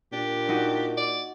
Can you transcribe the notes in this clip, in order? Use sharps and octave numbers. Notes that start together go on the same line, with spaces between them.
A#2 D4 G4
D#4 F#4
D5